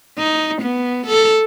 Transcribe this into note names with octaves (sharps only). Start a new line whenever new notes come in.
D#4
B3
A4